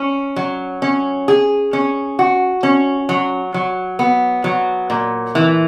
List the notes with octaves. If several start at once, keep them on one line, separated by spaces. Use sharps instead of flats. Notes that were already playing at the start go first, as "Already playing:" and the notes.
Already playing: C#4
F#3
C#4
G#4
C#4
F#4
C#4
F#3
F#3
B3
F#3
A#2
E3